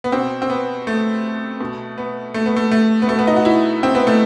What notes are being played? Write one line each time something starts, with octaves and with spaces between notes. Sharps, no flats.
B3
B2 C4
C4
B3
A3
B2
B3
A3
B3
A3
A3
B3
B2 A3
B3
D#4
F#4
E4
C4
B3
A3